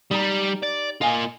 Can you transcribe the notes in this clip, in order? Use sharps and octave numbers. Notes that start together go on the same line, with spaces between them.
G3 D#4 G4 A#5
D5
A#3 F4 D#5 G#5